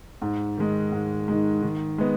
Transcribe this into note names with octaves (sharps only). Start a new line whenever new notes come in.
G#2
D#3 G#3
G#2
D#3 G#3
D#3
G#3 B3